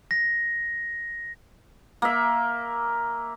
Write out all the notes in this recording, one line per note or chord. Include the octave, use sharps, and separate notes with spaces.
A#6
A#3 E5